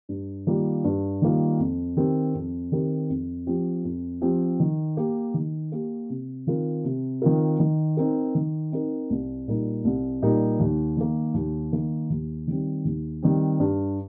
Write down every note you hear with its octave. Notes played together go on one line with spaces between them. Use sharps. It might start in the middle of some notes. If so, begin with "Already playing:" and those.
G2
D#3 G3 A#3 F4
G2
D#3 G3 A#3 F4
F2
D#3 C4 G4 A#4
F2
D#3 C4 G4 A#4
F2
F3 C4 G4
F2
F3 C4 G4
D#3
A#3 G4
D#3
A#3 G4
C3
D#3 C4 F4 A#4
C3
D#3 C4 F4 A#4
D#3
C4 D#4 A#4
D#3
C4 D#4 A#4
C2
A#2 G3 D#4 A#4
C2
A#2 G3 D#4 A#4
D#2
D#3 A#3
D#2
D#3 A#3
D#2
D#3 G3 C4
D#2
D#3 G3 C4
G2